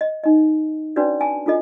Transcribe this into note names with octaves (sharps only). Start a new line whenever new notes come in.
D#5
D#4 D#5
C#4 D4 F#4 B4 C#5 D5
G#5 A5
D4 F4 A4 D#5